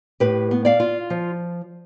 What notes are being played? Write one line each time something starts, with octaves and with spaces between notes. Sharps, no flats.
A2 G4 B4
B3
D5 F5
F4
F3